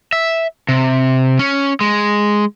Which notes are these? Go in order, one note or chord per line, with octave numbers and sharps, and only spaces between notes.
E5
C3
C#4
G#3